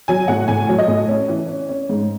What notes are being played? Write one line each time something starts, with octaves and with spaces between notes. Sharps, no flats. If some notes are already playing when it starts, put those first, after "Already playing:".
F#3 G#5
A2 F#5
A2 G#5
F#3
D#5
A2
C#4
E3
C#4
C#4
G#2